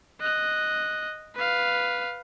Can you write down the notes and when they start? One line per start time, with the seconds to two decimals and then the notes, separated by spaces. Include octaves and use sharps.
0.21 D#5 F#6
1.36 B4 F5